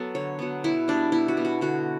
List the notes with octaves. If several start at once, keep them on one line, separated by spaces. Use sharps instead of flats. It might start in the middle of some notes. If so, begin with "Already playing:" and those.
Already playing: F#3 B3 A4
D3 C#5
F#3 B3
B2 E4
G3 B3 D4
B2 E4
F#4
G3 B3
F#4
D3 F#4